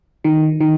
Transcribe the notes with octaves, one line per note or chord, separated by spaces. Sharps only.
D#3
D#3